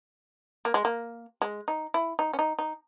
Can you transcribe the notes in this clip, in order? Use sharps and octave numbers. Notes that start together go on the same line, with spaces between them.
A#3
G#3
A#3
G#3
D#4
E4
D#4
C#4
D#4
D#4